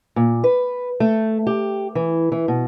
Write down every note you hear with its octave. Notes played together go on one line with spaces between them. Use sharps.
A#2
B4
A3
G4
E3
E3
B2